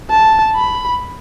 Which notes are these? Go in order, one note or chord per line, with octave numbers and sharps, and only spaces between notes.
A5
B5